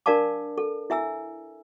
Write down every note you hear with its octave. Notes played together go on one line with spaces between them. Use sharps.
D4 A#4 D5 F5 A5 D6
A4
E4 E5 G#5 E6